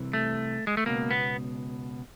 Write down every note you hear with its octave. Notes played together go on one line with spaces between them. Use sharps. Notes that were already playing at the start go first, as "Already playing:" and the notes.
Already playing: C2 C3 E3
A3
G#3
A3
C#2 B2 A#3
B3